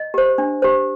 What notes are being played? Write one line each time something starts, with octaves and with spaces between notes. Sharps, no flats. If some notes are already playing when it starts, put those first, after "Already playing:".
Already playing: D#5
G4 C5
D4
G4 C5